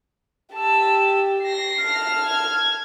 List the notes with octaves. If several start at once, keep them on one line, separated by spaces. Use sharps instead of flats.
G4 A5 E6
A#6 C7
A5 F6
G#6